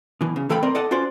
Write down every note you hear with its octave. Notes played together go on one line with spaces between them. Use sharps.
B2 E3
C#3
A2 E3 A4 F5 G5 B5
C4 A#4 D5 D#5
A4 D5 D#5 F#5 A5
C#4 F4 F#4 C5 D5